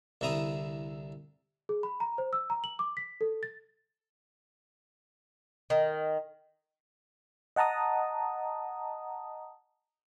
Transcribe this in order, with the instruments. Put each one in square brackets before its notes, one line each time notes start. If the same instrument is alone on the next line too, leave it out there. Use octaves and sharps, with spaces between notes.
[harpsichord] C2 D3 E4 A#5 D#6
[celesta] G#4
B5
A#5
C5
E6
A#5
F#7
D6
B6
A4
A6
[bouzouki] D#3
[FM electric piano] D#5 F#5 A5 A#5 D#6